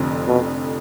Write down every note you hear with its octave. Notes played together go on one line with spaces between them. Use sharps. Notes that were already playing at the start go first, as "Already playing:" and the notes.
Already playing: F1 F2 D3
B2